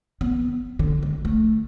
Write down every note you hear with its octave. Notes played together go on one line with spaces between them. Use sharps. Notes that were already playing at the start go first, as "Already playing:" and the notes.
B3
D3
G#3
A3